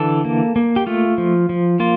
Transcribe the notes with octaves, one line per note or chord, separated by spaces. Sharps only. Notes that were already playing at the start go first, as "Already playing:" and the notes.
Already playing: D3 E3 A4
A#3
A#3
G4
A3 F4
F3
F3
A#3 F4